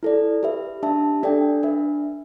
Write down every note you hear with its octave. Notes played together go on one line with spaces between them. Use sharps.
E4 A4 D5
G4 B4 E5
D4 G4 E5 A5
D4 A4 D5 G5
D4 B4 E5